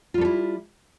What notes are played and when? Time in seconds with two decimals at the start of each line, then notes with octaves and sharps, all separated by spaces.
0.14 F4
0.18 G3
0.21 A4
0.25 E4